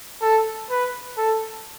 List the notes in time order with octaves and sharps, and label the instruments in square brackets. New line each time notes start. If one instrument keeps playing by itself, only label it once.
[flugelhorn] A4
B4
A4